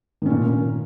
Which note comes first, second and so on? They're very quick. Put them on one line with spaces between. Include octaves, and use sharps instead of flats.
D#3 C#4 A#2